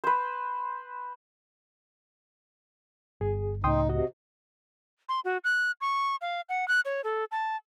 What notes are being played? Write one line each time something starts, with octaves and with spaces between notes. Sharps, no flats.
B4 C5
G1 G#4
C#2 A2 D#4 G5 C6 D#6
C3 F#4 D#5
C6
F#4
F#6
C#6
F5
F#5
F#6
C#5
A4
A5